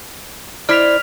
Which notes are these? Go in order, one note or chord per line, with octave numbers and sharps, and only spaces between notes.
E4 C5 D5 F6 B6 F7